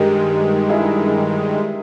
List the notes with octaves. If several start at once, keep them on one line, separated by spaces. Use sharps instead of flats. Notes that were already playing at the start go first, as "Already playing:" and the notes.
Already playing: G2 D#3 G#3 G4 A#4
E4 G#4